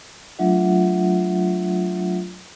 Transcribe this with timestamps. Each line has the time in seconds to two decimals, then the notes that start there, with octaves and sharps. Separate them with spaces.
0.39 F#3 A3 D4 F4 E5 F#5